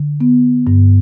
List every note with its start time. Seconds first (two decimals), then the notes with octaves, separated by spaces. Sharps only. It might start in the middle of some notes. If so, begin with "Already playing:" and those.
Already playing: D3
0.21 B3
0.67 G2